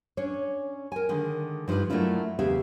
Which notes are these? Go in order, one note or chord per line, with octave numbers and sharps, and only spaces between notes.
C#4 D4 C#5
A#4 G#5
D3 D#3 G#3
G2 F3 D#4 F#4 B4
F#3 A3 A#3 D4 E4 F4
E2 C#3 B3 G4 E5 F5